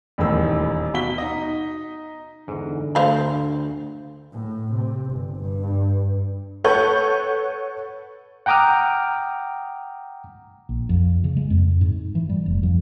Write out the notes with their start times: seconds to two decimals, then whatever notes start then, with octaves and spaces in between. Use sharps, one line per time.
0.18 D#1 E2 A2 D#3 E6
0.94 B2 F#4 B6 G7
1.18 D#4 D#5
2.48 E2 G#2 D3
2.95 D2 C5 F5 B5
4.33 A2
4.74 C3
5.12 G1
5.41 G2
6.64 A4 B4 C#5 F#5 G6
8.46 F#5 G5 A#5 D6 D#6 F6
10.69 A#1
10.89 F2
11.24 C#3
11.37 G#3
11.50 F2
11.81 G#2
12.15 E3
12.29 G3
12.46 F1
12.63 F2